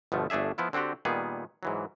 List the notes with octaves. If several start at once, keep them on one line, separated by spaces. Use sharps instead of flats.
G1 B2 F3 A3
G1 A3 D4 G#4 E5
F3 B3 E4 F4
D3 C4 D4 F#4 G4
A#2 D#3 G3 B3 G#4
G#2 E3 F#3